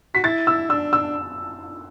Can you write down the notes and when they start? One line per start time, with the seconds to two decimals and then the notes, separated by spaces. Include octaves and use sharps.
0.14 F#4 B6
0.24 E4 A6
0.47 E6
0.70 D4 E6
0.93 E6